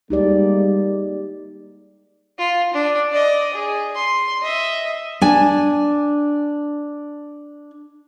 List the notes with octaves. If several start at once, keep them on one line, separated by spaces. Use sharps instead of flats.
G3 G#3 A#3 D#4 G4 D5
F4
D4
D5 D#5
G#4
C6
D#5 E5
D4 G#5